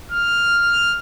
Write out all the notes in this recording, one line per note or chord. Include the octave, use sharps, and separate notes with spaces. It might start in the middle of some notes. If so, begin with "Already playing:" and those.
F6